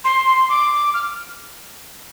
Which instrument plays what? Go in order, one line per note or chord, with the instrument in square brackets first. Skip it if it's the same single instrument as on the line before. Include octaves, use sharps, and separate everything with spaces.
[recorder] C6
D6
F6